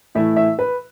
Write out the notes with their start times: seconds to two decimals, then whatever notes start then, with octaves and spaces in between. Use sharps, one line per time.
0.15 A2 E3 A3 E4 E5
0.36 E5
0.59 B4